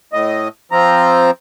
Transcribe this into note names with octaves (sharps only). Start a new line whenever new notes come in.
A2 D#5
F3 C4 A#5